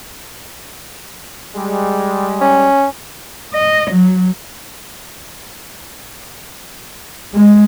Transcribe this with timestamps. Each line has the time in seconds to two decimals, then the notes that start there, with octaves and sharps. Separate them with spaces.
1.56 G3 G#3
2.41 C#4
3.54 D#5
3.91 F#3
7.34 G#3